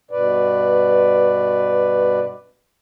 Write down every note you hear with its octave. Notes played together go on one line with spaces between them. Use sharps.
G2 B2 B4 D5